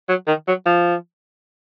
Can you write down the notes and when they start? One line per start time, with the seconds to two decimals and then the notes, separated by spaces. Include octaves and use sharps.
0.09 F#3
0.28 D#3
0.48 F#3
0.66 F3